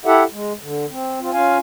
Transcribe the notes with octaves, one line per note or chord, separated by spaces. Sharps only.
E4 G4 A4 E5 F#5
G#3
D3
C4
C4 F4
C#4 F4 F5 G#5